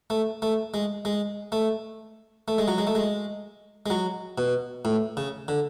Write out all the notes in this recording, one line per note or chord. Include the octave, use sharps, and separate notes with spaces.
A3
A3
G#3
G#3
A3
A3
G#3
F#3
G#3
A3
G#3
G#3
F#3
B2
A2
C#3
D3